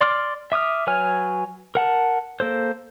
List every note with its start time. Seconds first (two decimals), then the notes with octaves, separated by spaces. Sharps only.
0.01 D5 C6 D6 F6
0.52 E5 D6 D#6 F6
0.87 F#3 B4 C#5 G#5 F6
1.75 A#4 F#5 A5
2.40 A#3 A4 C5